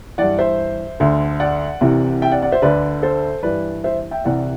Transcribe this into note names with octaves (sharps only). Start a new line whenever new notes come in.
G2 E3 D5 F#5
C5 E5
D2 D3
D5 F#5
C2 C3 E3
E5 G5
D5 F#5
D5 F#5
C5 E5
D2 D3 B4 D5
A4 C5
G2 E3 B4 D5
C5 E5
E5 G5
C2 C3 E3 D5 F#5